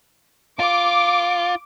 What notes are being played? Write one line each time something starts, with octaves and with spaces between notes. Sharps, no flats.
F4 D6